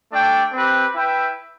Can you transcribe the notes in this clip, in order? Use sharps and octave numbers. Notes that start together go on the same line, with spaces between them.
A3 D4 A4 D5 G5
C4 G4 B4
E4 B4 E5 G5